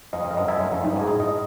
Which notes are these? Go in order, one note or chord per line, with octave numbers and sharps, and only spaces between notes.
F2 D#5
F2
D#5
F#2
F#2 E5
F#2
C#4
F2
G2 D#4
G#2
G#4
A2
D#5